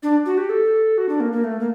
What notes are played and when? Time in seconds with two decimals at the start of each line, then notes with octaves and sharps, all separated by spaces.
0.03 D4
0.26 F#4
0.38 G4
0.49 A4
0.98 F#4
1.09 D4
1.20 A#3
1.32 A#3
1.44 A3
1.60 A#3